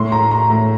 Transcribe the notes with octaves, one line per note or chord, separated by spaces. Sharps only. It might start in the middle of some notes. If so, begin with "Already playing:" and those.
Already playing: A2 C6
A#5
A#5
A2 A#5